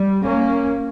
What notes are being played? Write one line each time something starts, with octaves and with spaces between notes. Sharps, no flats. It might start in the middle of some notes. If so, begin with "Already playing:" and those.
Already playing: G3
A#3 C#4